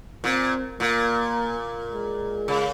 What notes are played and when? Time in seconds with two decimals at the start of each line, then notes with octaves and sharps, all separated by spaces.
0.24 A#2 C4
0.80 A#2 A#3
1.92 G#3
2.48 C#3